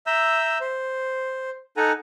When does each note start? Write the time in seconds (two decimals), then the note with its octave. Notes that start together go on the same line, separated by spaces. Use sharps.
0.07 E5 A#5 E6 G6
0.61 C5
1.77 D#4 A4 F#5 G#5 A#5